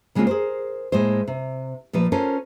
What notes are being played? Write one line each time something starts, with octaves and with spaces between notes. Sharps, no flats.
C#3 G#3 A#3 C4 F4
G#4 A#4 C5
A2 G#3 A#3 C5
C3
A#2 F3 A3 B4
C#4 F4 A4 A#4 C5